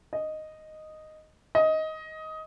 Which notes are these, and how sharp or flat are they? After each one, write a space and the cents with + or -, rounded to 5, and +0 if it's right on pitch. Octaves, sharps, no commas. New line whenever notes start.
D#5 -5
D#5 +15